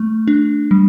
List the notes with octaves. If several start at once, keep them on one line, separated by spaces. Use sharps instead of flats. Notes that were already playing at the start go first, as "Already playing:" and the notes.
Already playing: A3
D4
G3